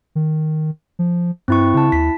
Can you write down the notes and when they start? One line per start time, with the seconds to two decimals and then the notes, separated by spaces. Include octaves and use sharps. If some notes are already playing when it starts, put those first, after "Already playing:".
0.15 D#3
0.99 F3
1.48 G2 C4 E4 C#6
1.74 C#3 E4 A5
1.92 D#2 B6